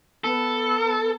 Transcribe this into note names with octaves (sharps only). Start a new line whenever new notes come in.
B3 A4